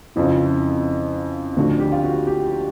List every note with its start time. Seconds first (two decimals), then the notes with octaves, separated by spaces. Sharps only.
0.16 F2 C#3 F3 E4
1.56 D2 D3 F3 A3 D4 F#4
1.80 G4
1.92 F4
2.03 F#4
2.27 G4